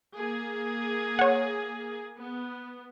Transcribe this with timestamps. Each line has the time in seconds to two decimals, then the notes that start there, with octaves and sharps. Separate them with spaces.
0.16 A#3 G#4
1.19 C#5 F#5
2.16 B3